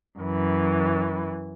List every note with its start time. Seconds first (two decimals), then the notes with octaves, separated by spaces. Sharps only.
0.19 F#2 E3